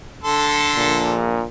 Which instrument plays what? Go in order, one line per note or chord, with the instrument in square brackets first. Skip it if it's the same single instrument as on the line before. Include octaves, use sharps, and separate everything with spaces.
[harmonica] D3 A4 C6
[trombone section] A#1 A#2